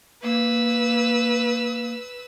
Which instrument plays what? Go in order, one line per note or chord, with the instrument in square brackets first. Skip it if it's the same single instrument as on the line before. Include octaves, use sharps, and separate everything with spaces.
[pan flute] A#3 [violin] B4 E6